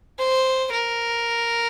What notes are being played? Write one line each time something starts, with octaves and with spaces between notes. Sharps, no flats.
C5
A#4